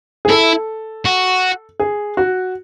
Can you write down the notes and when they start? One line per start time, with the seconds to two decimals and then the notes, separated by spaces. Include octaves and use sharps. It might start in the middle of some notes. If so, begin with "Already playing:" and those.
0.25 G#4
0.29 E4 A4
1.05 F#4
1.80 G#4
2.17 F#4